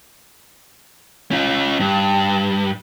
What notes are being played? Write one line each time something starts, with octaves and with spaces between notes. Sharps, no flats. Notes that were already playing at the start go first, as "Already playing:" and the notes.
C#4 F4
G2